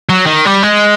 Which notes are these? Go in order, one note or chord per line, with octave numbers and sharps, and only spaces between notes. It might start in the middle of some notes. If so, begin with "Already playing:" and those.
F#3
D#3
G3
G#3